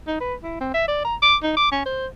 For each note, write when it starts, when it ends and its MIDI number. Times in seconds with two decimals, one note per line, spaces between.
0.07 0.21 63
0.21 0.34 71
0.43 0.59 64
0.61 0.72 60
0.74 0.85 76
0.88 1.01 74
1.05 1.15 82
1.22 1.36 86
1.43 1.54 63
1.57 1.72 86
1.72 1.85 61
1.86 2.07 72